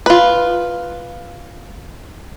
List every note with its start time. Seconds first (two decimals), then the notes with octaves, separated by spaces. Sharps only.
0.06 F4 B4